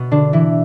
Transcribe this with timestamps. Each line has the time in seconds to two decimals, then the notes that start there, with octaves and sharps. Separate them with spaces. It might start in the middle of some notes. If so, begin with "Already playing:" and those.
Already playing: B2 B3
0.11 D3 D4
0.33 E3 E4